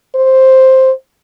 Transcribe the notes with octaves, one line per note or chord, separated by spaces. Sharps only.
C5